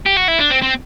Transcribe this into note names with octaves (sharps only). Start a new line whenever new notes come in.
G4
F#4
E4
D4
C4
C4